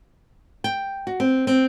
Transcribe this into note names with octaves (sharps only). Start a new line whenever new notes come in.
G5
F#4
C4
C4